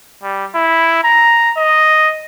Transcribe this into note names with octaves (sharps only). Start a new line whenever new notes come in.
G3
E4
A#5
D#5